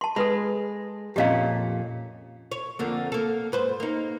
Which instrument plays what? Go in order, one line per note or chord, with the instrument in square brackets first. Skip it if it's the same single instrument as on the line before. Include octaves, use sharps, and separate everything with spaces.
[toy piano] A5 C6
[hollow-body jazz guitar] G#3 [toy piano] A4 B4 B5
[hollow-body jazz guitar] F2 A#2 C#4 [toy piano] G4 D#5 F5
[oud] C#5
F2 D3 A#3
A#3 A4
G#2 B4 C5
A#3 D#4